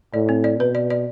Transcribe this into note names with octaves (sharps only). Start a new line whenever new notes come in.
A2 D5
C4
D5
B2 B4
D5
D5